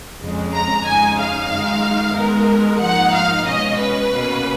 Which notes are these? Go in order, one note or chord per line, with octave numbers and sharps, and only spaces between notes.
F2 C#3 G#3
A#5
F2 C#3 G#3 D#4 G#5
F5
F#2 D#3 G#3 D#4
D#3 G#3 B3 D#4 A#4
G#2 F3 A#3 D#4 F#5
F5
B2 G#3 C#4 D#5
B4
B2 A#3 C#4